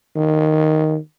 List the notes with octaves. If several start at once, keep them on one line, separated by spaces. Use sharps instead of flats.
D#3